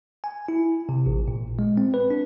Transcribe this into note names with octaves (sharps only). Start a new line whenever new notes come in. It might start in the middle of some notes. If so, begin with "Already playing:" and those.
G#5
E4
C3
A1
A#2
G#3
C4
B4
D4